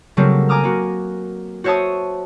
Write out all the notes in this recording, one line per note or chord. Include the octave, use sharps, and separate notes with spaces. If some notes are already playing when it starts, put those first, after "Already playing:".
C#3 F#3 G3 A3 A#3 C4
G#5 A#5 D6 D#6 F6
A#3 F#4
F#4 C5 C#5 E5 A5 D#6